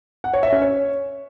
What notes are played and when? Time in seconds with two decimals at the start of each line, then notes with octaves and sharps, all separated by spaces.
0.24 F#5
0.34 C#5
0.43 E5
0.52 C#4
0.62 C#5